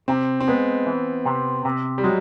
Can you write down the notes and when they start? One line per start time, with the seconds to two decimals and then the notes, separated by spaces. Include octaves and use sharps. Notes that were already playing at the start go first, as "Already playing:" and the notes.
0.08 C3 C4
0.40 C4
0.48 G#3 B3
0.86 E3
1.25 C3
1.65 C3
1.98 G3
2.04 F#3 G#3